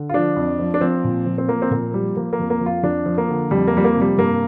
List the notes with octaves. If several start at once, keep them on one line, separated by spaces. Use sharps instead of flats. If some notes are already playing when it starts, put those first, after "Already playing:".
Already playing: D3
F4
F3 D4
F2
F3
D4
F3 C4
A#2
F3
C4
F3 A#3
C4
A#2 A#3
F3 G3
F3 A#3
A#3
F2
A#3
F3
F4
F2 D4
F3
A#3
D3
F2 G3
A#3
F3 G3
A#3
C3
G3
G2 A#3